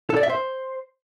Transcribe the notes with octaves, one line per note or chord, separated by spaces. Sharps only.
A4
D5
E5
C5